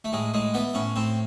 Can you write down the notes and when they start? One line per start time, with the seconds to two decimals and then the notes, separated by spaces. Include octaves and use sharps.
0.05 A3
0.12 A2 G#3
0.34 A2 G#3
0.54 E3 B3
0.74 A2 C#4
0.96 A2 C4